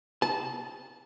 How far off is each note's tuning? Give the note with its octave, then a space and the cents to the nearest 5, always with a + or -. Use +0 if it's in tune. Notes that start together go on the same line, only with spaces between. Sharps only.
A5 -25